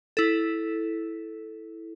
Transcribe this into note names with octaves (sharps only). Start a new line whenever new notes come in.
E4 A4